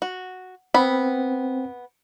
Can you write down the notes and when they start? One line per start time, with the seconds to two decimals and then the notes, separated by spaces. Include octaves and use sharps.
0.02 F#4
0.74 B3 C4 B5